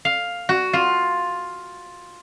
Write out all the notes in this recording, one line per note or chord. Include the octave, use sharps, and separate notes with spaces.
F5
F#4
F4